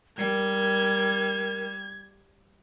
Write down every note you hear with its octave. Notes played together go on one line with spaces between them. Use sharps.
G3 A#4 G#6